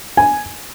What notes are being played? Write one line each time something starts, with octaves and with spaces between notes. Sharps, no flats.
G#5